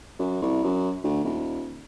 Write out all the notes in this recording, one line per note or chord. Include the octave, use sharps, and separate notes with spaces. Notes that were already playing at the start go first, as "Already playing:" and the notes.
F#2
C2
F#2
D2
D#1